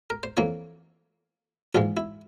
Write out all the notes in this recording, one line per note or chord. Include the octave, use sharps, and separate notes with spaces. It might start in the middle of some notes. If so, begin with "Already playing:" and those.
A#4
C5
F2 E3 A#3 C#5
A#1 G#2 E3 G#3 F4
E4